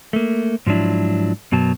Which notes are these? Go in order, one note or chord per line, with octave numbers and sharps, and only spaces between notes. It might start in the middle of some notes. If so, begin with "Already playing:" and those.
A3 A#3
G#2 F3 F#3 D4 E4
F#2 B2 F#3 A5